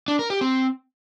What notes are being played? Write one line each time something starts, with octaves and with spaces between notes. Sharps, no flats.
D4
A#4
G4
C4